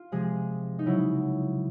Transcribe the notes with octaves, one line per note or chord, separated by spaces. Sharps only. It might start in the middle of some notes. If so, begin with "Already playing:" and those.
Already playing: F4
C3 F3 G#3 G#4
D#4
C#3 F#3 E4